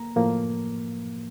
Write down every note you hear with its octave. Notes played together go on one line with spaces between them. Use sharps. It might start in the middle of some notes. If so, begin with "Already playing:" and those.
Already playing: A#3 A#5
A2 F3 A#3